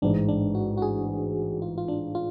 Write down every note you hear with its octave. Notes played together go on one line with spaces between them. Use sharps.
A1 G#2 G#3 D4
D4
F#4
F#4
G#4
F4
F4
D4
F4